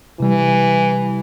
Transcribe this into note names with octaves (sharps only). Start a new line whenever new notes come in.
C3 E3 G3